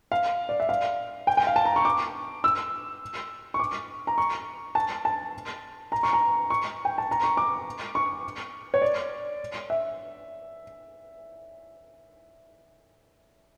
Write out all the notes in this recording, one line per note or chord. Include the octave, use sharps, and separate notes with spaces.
F5
D5
E5
F5
G5
G5
F5
A5
A#5
C#6
D6
E6
C#6
D6
A#5
C#6
A5
A5
A#5
C#6
A#5
C#6
G5
A5
A#5
C#6
D6
C#6
C#5
D5
E5